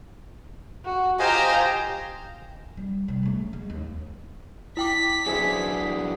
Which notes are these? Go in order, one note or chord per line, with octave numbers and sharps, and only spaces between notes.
F#4
F4 G4 C5 D#5 F5 G#5 A#5
G3
C3 G3
C#3 A3
G#3
D#2
E4 G5 D6 B6
F#3 B3 D4 G#4 C5 E5